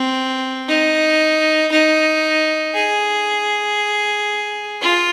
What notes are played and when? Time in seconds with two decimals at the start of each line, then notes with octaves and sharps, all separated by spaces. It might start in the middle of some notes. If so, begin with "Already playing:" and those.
Already playing: C4
0.68 D#4
1.72 D#4
2.74 G#4
4.81 F4